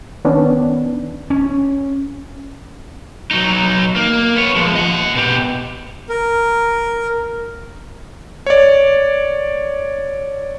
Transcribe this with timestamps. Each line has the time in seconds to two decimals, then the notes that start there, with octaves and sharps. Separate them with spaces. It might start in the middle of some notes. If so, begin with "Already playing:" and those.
0.25 D#3 B3 C#4 D4
1.30 C#4
3.31 F#3 D#4
3.96 A#3
4.36 B3 C#5
4.56 F3 G#3
4.75 D#5 F#5
5.15 B2 G4
6.09 A#4
8.46 C#5 D5